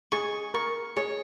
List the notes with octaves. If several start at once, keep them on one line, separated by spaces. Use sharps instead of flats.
G#4 C#6
A#4 C#6
G#4 C#5